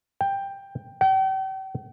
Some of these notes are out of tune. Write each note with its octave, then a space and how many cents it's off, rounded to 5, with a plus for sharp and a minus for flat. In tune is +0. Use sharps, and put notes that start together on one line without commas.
G5 +10
G5 -40